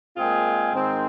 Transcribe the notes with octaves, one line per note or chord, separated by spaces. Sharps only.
A#2 G#3 C4 F4 G#4
G#2 D#3 C4